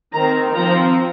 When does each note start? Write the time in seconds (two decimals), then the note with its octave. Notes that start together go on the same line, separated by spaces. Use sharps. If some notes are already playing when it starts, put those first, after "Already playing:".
0.14 D#3 C4 A#5
0.55 F3 C4 A#5